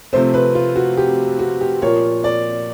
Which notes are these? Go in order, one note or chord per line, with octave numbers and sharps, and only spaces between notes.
C3 F3 A3 C4 C5
B4
F4
F#4
G4
F#4
G4
A#2 F3 A#3 C#5
D5